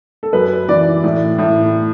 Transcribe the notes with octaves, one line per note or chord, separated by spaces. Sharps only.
A4
F#2 B4
E3 D5
A2
A2